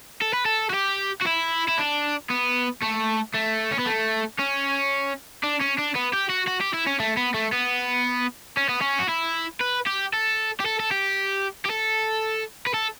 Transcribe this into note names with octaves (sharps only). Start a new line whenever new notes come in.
A4
B4
A4
F#4
G4
F#4
E4
E4
D4
B3
A3
A3
C#4
B3
A3
C#4
D4
C#4
D4
B3
G4
F#4
F#4
G4
E4
C#4
A3
B3
A3
B3
C#4
B3
C#4
F#4
E4
B4
G4
A4
G4
A4
A4
G4
G4
A4
B4
A4